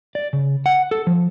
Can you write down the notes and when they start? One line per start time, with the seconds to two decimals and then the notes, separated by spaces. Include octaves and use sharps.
0.15 D5
0.33 C#3
0.66 F#5
0.91 A4
1.07 F3